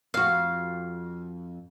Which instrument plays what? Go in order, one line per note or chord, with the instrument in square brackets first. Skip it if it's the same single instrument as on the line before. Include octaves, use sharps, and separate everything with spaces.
[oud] F2 F#4 [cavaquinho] F5